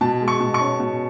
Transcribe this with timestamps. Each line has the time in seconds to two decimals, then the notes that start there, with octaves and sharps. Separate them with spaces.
0.01 B2 A5
0.21 G#3
0.28 C#6
0.40 B2
0.54 C#6
0.60 C#4
0.80 B2